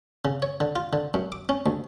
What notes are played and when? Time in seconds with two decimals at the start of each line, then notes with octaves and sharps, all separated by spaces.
0.25 C#3
0.42 C#5
0.60 D3
0.76 F4
0.93 D3
1.14 F#2
1.32 D6
1.49 C#4
1.66 D2